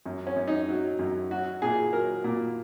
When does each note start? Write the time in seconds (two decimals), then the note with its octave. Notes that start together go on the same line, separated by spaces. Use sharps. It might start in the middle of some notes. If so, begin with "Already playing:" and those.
0.06 F#2
0.27 C#4
0.36 F#2
0.48 D#4
0.68 F#3
0.99 F#2
1.31 F#3 F#4
1.62 A#2 G#4
1.93 F#3 A#4
2.24 A#2